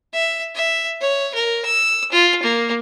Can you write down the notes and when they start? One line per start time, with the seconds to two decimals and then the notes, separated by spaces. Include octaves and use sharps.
0.14 E5
0.55 E5
1.01 C#5
1.35 A#4
1.65 E6
2.12 F4
2.43 A#3